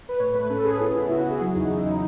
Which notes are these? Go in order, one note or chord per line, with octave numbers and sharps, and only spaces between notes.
B4
A2 C#5
A3 B4
C#4 A4
C#4 G#4
B3 E4
C#3 E4
C#3 F#4
F#4
C#3
G#4
F#3 E4
E2 D#4
E2 E4
F#3 D#4